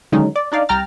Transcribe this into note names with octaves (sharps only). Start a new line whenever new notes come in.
D3 D#3 F#3 G#3 C#4 D#4
D5
D4 D#4 D5 F5
C2 G5 A#5 F6 A6